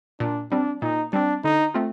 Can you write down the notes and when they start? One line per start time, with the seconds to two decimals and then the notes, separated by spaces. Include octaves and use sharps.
0.20 A#2 D4
0.51 G3 C4 D4
0.82 A#2 D#4
1.13 G3 C4 D4
1.44 D3 D#4
1.74 A3 C4 F4